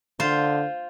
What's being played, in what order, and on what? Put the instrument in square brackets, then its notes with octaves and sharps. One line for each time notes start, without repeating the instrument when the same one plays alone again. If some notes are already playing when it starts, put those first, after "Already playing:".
[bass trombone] D3 [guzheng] F4 C5